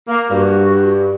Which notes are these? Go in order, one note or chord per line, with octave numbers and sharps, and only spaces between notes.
A#3
G2 F#4